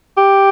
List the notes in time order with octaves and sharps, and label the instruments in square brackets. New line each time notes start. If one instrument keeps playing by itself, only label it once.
[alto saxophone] G4